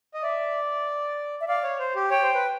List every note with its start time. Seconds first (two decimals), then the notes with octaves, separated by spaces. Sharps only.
0.14 D#5
0.22 D5 E5
1.41 E5
1.48 D5 F5
1.63 C#5
1.79 C5
1.95 G4
2.10 C#5 G5
2.22 C5
2.34 B4